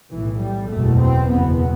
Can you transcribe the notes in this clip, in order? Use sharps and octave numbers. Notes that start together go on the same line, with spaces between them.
B1 A2 E3
G3
F#1 E2 B2 A3
C4
F#1 E2 B2 B3